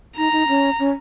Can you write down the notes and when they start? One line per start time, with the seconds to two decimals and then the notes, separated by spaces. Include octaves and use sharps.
0.17 D#4 A#5
0.32 D#4
0.48 C#4
0.79 C#4